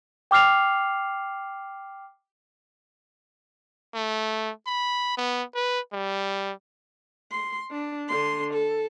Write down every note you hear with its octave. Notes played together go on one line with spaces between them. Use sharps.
G5 D6 F6 C7 F7
A3
B5
B3
B4
G3
C6
D4
D3 C6
A4